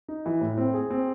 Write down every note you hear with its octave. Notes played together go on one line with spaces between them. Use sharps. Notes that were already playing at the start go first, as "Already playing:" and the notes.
D#4
E3
A2
C4
G#4
C4